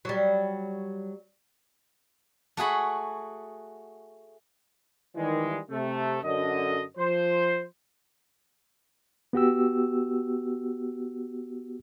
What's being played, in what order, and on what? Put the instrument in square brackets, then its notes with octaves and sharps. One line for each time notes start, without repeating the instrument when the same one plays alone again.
[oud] F#3 G3
[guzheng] A3 F#4 G#4 B5
[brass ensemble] D#3 E3 G3 G#3
C3 A3
F#2 D3 D#5
F3 C5
[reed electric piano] B3 F#4 G4 E6